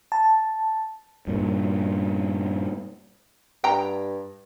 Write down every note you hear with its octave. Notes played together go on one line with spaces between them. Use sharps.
A5
G2 A#2
G2 G5 A#5